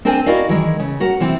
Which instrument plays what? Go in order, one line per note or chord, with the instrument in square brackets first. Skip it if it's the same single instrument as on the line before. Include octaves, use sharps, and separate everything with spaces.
[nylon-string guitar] C4 D4 A#4 C5 G5 G#5
E4 F#4 A#4 D5 D#5 F5
D#3 E3 G#3
C#3
F#4 A#4 F#5
C3 E3 C4